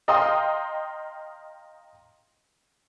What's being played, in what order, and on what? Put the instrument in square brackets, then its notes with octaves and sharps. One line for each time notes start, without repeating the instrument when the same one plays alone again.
[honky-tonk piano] D#5 F5 G5 A#5 C6 D#6